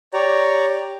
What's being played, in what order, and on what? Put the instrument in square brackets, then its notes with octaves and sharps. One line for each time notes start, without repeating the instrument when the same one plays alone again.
[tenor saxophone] G4 [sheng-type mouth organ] C#5 D5 A#5